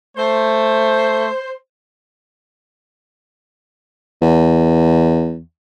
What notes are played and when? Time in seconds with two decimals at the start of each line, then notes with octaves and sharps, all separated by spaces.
0.17 A3 C5
4.22 E2